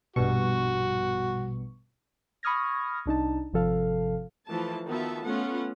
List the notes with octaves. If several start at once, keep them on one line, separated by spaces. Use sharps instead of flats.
A#1 G2 B2 F#4 C#6
B5 C#6 D#6 F6 G#6 A#6
C2 D4 D#4 A5
G#1 C3 F3 A4 F5
E3 F3 A3 A5
D#3 B3 F4 F#4 E5 A5
A3 B3 C#4 F4 F#5